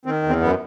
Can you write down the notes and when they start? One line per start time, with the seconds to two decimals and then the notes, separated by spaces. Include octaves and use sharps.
0.05 D#3 C4
0.24 E2
0.29 C4
0.41 F#2 B3